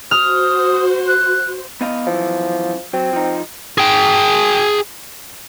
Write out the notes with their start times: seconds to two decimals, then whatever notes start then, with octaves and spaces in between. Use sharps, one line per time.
0.11 F#4 C5 D#6 F6
1.07 F#6
1.81 B3 D#5 F5
2.07 F#2 E3 F3
2.93 F#3 C4
3.13 F3 D#4
3.78 G#4 G5